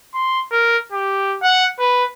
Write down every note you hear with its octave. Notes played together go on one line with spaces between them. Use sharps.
C6
A#4
G4
F#5
B4